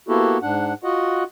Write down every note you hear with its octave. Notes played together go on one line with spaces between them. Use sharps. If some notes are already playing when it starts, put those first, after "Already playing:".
A#3 B3 E4 F#4 G4 A4
G#2 D4 F#5
F4 F#4 D#5 F#5